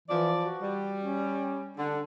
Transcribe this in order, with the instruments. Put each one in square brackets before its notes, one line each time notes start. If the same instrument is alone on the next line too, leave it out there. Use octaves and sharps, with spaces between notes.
[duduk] E3 [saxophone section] F3 D5
[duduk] F#4
[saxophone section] G3
[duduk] C#4
[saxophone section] D3 [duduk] D4